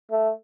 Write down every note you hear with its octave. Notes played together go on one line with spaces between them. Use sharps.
A3